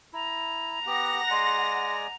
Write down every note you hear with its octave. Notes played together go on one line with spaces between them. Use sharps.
E4 A#5
B3 G4 F#5 A#6
G#3 D5 G#5 C6